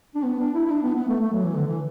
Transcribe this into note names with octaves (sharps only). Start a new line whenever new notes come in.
D4
B3
D4
E4
E4
D4
B3
B3
A3
A3
F#3
E3
D3
E3